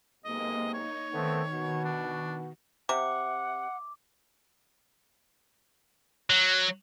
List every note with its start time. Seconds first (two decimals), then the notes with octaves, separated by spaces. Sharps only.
0.25 B1 C3 G#3 A#3 D#5
0.74 D#4 C#5
1.13 D#3 A3 B3 C4
1.51 B2 F#4
1.85 D4
2.89 C3 F#5 D6
6.30 F#3